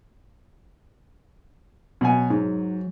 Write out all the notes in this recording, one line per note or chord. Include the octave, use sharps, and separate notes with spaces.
B2 F#3 F#5 G#5
G#2